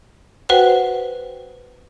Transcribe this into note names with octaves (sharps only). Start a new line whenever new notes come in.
F#4 B4 C5 F#5 G5